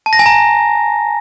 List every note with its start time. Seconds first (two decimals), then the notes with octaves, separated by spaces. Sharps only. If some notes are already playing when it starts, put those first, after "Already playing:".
0.06 A5
0.13 A#6
0.19 G#5
0.26 A#5